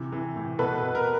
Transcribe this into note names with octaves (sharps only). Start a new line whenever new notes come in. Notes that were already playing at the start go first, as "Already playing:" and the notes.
Already playing: C3 E3
E3
A2
B2 A4 B4
B2
A#4